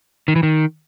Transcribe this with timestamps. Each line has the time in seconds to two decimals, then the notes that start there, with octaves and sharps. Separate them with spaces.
0.28 D#3
0.36 E3
0.43 D#3